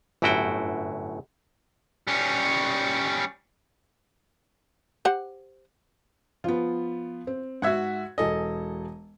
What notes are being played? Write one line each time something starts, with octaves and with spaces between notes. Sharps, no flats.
G1 F#2 A2 E4 F#4 G5
G3 C#4
G4 C5 F#5
F3 B3 F4
C4
G#2 F#4 E5 F#5 G#6
E1 A4 D#5 G#5